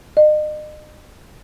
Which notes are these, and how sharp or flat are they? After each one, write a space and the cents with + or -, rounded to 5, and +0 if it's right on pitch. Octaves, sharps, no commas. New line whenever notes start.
D#5 -40